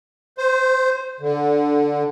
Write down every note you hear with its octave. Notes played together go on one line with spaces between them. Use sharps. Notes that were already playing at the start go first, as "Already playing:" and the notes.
C5
D3